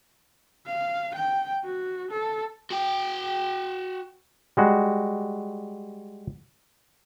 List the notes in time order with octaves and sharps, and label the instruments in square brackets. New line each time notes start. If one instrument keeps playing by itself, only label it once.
[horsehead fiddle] F5
G5
F#4
A4
[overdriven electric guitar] F#4 G5
[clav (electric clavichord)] G3 G#3 F#4